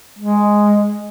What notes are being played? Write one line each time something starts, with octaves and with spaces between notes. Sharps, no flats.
G#3